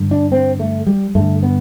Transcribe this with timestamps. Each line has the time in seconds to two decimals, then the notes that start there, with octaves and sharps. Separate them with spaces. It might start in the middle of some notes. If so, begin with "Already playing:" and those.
Already playing: G2 D3
0.11 D4
0.32 C4
0.59 A3
0.87 G3
1.15 G2 D3 A3
1.43 B3